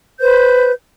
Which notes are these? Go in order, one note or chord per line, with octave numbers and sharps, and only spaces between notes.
B4 C5 G6